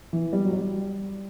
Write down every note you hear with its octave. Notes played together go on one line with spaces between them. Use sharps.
E3
G3
F#3
G3